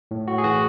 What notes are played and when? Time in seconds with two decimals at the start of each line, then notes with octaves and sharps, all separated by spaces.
0.11 A2
0.28 A2 F#4
0.38 G#4
0.44 E3 F#4